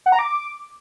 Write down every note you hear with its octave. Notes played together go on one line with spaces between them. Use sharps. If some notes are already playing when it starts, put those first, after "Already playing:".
F#5
A#5
D6